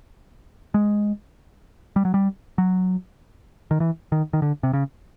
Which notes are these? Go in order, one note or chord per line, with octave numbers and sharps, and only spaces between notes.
G#3
G3
F#3
G3
F#3
D#3
E3
D#3
D#3
D3
C3
C#3